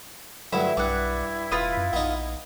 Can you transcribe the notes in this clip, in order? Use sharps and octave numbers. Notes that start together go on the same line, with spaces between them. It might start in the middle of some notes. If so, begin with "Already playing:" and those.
D2 G2 F#3 E4 F#5
B1 G2 E4 D5 F#5
E1 F4 B4 D#6
F#2
A#1 B3 D#4